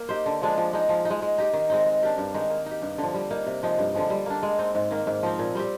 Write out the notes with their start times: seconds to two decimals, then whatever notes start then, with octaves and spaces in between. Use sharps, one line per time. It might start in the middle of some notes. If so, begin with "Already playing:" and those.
Already playing: A#3
0.09 D#4 G4 C5
0.26 D3
0.41 F3 G#3 D4
0.58 F3
0.73 G#3 D#4
0.89 F3
1.05 D#4
1.10 G#3
1.22 G#3
1.38 D#4 G4
1.54 D#3
1.70 G#3 C4 D#4
1.86 G#3
2.02 D4 G4 A#4
2.18 G2
2.34 D#3 G#3 D#4
2.50 A#3
2.66 D#4 G4
2.82 G2
2.98 D3 F3
3.14 G3
3.31 A#3 D#4
3.46 C3
3.63 F3 G#3 D#4
3.79 G2
3.94 D3 F3 G#3
4.10 G3
4.26 A#3 D4
4.43 G#3
4.59 C4 D#4
4.75 G#2
4.91 D#3 A#3
5.07 G#2
5.23 F3 C4
5.39 A#2
5.55 G3 C4 G4